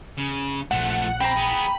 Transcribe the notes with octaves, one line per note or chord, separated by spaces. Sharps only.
C#3
A#1 F3 A3 F#5
C4 G5 A#5 B5
B3 G#4